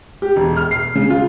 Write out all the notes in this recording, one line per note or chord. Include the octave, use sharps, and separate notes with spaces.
G4
E1
F6
C7
C#3
F4